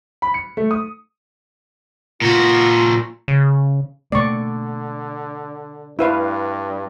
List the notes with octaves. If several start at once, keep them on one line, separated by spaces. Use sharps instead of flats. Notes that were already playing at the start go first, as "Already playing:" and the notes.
B5
C#7
A3
D#6
A#2 F4 F#4
C#3
B2 D3 A3 A#3 D5 C#6
G2 E4 B4 F5